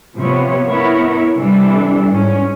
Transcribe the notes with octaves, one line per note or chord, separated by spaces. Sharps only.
C3 F3 B3 C#5
B3 E4 A#4 C#5
C3 E3 G3 D4 A4
G#2 C#4